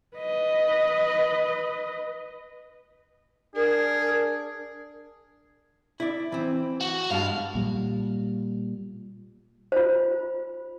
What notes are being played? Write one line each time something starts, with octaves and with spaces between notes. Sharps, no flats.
B4 D#5
D4 G#4 A#4
E4 D5
E3 C4
F#4
G2 G#3 F5 A5
A#2 G3
F4 C5